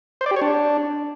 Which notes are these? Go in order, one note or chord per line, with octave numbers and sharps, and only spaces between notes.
C5
D5
G4
C#5
D4